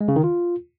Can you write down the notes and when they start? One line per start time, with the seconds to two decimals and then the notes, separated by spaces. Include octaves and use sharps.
0.01 G#3
0.08 C#3
0.16 D#3
0.24 F4